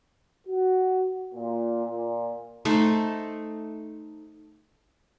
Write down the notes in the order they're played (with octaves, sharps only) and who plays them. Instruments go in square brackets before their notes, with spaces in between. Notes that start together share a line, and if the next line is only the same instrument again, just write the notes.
[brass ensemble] F#4
A#2
A#2
[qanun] A3 D#4 A4 C5